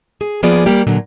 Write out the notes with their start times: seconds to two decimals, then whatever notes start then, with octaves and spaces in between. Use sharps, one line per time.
0.21 G#4
0.43 F3 A#3 B3 F4 G#4 D5
0.66 G3 A#3 G4
0.87 A#2 D3 F#3